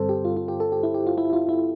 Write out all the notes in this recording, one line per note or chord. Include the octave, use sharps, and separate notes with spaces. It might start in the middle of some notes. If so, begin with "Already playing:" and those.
Already playing: G2 D3 G3 C4 A4 C5
G4
F4
F4
G4
A4
G4
E4
G4
F4
E4
F4
E4